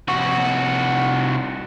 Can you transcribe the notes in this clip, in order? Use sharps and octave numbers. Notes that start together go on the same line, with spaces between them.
C2 F#4